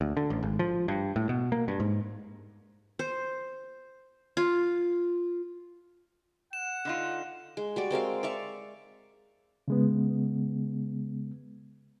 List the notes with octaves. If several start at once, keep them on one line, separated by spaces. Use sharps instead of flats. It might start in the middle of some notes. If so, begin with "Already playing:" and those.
D2
D3
A1
G#1
F3
G2
A2
B2
A#3
G2
G#2
C5
F4
F#5 E7
D3 D#4 F4
G#3
G3 F#4 D5
G#3 C4 A#4 F5
D5 E5 F5 C#6
C#3 G#3 B3